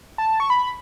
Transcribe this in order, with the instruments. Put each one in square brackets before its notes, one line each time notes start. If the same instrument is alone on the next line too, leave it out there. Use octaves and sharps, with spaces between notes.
[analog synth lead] A5
C#6
B5